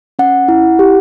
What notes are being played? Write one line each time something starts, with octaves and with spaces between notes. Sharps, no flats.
C#4 F#5
E4
G4